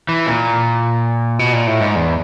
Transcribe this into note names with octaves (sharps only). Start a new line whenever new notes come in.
E3
A#2
B2
A#2
A2
G#2
E2